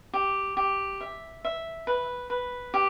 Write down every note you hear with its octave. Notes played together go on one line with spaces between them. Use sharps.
G4
G4
E5
E5
B4
B4
G4